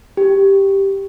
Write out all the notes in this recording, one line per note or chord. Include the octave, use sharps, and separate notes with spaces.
G4